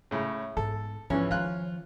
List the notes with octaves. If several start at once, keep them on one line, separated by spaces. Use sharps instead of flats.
A2 C#3
G#2 B3 A4
E2 G#2 E3 F3 C#4
D#3 F4 F#6